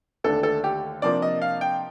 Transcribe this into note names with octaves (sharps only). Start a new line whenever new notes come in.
D#2 D3 A3 D4 A4
A4
G4
C3 F3 A#3 D4 D5
D#5
F5
G5